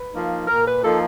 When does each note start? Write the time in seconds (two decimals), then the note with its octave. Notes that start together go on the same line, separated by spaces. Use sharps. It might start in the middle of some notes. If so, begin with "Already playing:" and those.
Already playing: B4
0.13 F3 A#3 D#4
0.48 A#2 A#4
0.66 B4
0.84 F3 A#3 D#4 A4